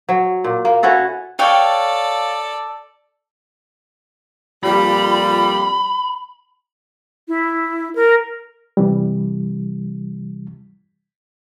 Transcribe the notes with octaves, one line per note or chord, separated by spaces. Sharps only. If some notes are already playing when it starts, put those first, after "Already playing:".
F#3
A#2
A#3
C#4 E4 F#4 A4
A4 C#5 D5 F5 G5
F2 A#2 G3 B5
E4
A#4
C3 E3 G3